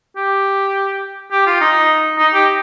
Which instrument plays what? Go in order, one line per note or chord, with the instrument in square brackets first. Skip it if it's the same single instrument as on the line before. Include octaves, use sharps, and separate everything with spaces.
[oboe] G4
G4
F4
D#4
D#4
G4